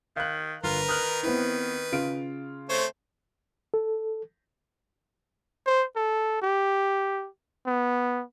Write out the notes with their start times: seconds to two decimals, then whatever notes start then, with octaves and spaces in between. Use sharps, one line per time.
0.16 D#3 F5 F#6
0.64 G1 F4 A#4 B4
0.88 D#3 D#6 F6 F#6
1.23 B3 C4 E4 B4
1.92 C#3 F4 D7
2.69 A3 C4 C5 C#5
3.74 A4
5.66 C5
5.96 A4
6.42 G4
7.66 B3